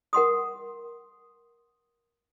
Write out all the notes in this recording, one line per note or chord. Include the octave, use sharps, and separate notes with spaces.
A#4 F#5 C6 D#6